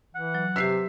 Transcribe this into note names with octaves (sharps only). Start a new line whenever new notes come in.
E3 F#5
F#3
C3 G4 B4 E6 B6 C7